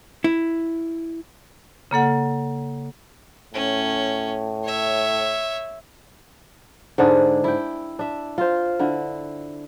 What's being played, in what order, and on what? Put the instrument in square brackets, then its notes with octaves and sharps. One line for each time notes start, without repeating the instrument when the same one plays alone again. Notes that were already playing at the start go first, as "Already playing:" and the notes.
[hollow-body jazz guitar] E4
[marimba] C#3 A#3 A4 F#5
[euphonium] A2 [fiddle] C#4
[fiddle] C#5 E5
[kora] G#2 D3 D4 G#4
E4 G5
D4 E5
F4 C5
D3 E4